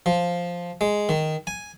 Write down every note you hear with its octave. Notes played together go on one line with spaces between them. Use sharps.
F3
G#3
D#3
G#5